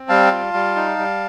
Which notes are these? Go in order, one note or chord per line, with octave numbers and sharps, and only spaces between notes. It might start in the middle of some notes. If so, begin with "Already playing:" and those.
Already playing: C4
G3 F5 A5
F4
G3
D#4
G3